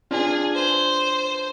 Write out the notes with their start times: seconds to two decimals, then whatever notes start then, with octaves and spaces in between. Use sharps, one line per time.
0.11 D4 F4 G#4
0.55 C5